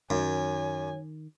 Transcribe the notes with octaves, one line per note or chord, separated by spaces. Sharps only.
F#2 D#3 C#5 G#5